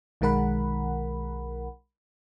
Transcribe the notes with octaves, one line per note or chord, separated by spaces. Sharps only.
B1 D#3 G#3 A#4 F#5 B5